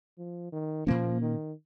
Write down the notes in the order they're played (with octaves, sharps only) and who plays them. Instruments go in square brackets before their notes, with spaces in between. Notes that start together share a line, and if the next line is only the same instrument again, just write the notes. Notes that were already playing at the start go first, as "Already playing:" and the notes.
[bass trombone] F3
D#3
[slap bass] A#2 A#3 C#4 [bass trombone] F3
[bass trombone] D#3